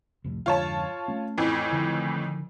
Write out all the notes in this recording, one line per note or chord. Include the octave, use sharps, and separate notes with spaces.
C2 F2 A2
F2 G#2 D3 F4 C#5 A5
A3 C#4
F2 A2 E3
D3 D#3 F3